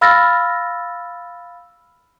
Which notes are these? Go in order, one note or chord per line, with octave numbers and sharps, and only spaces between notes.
F5 B5 E6 F6 A6 A#6